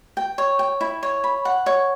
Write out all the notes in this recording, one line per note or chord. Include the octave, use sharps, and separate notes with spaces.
G5
C#5
G5
E4
C#5
B5
F#5
C#5